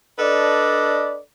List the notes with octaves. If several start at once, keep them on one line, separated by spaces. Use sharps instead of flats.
D4 A4 B4 D5 D#5